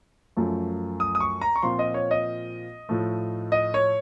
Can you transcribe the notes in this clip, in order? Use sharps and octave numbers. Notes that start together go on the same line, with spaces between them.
F#2 F3 A3
D#6
D#6
C#6
A#5
C#6
A#2 F3 C4 F4 C6
D#5
C#5
D#5
A2 F3 A3
D#5
C#5